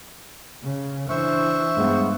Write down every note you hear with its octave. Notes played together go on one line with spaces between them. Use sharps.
C#3
E3 D4 C5 E5 C#6
G2 G#3 B3